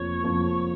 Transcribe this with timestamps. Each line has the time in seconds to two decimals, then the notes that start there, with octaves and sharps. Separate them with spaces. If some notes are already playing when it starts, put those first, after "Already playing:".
Already playing: F1 F2 F3 A#3 C#5
0.23 F1 F2 F3 A#3